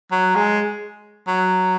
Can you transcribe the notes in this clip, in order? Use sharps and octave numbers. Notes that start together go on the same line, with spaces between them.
F#3
G#3
F#3